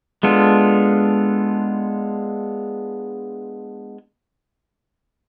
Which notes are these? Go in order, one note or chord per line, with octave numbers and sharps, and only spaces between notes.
G#3 B3 D4 F4 A4